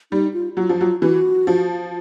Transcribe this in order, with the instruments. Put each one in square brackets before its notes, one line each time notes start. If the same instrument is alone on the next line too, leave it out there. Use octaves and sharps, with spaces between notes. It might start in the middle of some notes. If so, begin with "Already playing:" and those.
[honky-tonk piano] G3 [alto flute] D#4
[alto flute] F4
[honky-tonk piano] F#3 [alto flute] F4
[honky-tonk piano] F3
[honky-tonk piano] F#3 [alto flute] F4
[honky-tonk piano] E3 [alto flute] F#4
[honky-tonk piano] F3